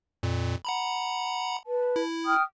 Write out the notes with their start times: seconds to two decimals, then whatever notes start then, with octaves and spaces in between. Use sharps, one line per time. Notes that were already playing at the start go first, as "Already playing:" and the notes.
0.23 F2 A#2
0.65 F#5 A#5 B5
1.66 B4 A5
1.96 E4
2.26 G5 D#6 F6